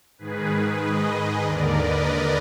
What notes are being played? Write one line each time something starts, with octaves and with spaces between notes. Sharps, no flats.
G#2 D#3 G#4 B4
B4 D#5
D#2 D3 A#4 D5
B4 D#5
A#4 D5